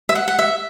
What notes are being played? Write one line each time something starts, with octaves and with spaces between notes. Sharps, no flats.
E5
F#5
F#5
E5